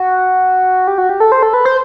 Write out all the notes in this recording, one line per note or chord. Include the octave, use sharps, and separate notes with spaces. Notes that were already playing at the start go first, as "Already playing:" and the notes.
Already playing: F#4
G4
F#4
G4
A4
C5
A4
B4
C5